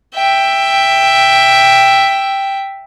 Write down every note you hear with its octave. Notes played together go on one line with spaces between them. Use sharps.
E5 G5